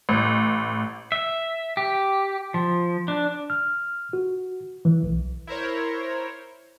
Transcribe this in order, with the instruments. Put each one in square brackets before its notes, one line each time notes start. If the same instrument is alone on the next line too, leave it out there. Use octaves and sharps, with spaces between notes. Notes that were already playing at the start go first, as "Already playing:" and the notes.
[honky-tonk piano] A1
[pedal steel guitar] E5
G4
F3
D4
[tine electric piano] F6
F#4
E3
B1
[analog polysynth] E4 A#4 C5 C#5